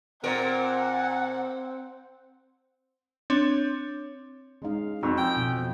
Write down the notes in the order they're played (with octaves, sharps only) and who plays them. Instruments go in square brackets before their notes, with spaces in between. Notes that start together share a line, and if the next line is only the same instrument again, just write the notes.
[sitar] A#2 A#4 [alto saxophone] C4 [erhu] F#5
[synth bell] C4 D4 C#5
[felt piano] G#3 D#4 [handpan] C#4 F5
[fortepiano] F2 [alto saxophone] D#4 [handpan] F#4 [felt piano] C#6 E6
[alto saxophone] G5 [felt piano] G#5
[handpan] B2
[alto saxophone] F3